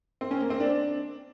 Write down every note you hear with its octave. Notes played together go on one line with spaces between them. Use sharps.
C4
C#4
A#3
C4
D4